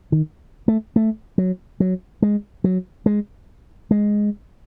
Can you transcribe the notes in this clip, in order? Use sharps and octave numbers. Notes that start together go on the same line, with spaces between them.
D#3
A3
A3
F#3
F#3
G#3
F#3
G#3
G#3